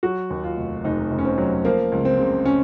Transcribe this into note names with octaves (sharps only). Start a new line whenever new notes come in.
F#3 F#4
D#2
F4
F1
F1 D#4
F1
C#4
C4
F#3
F3 A#3
C#2
C4
C#3
C#4